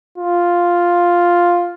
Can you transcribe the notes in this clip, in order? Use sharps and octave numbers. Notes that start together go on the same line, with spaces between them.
F4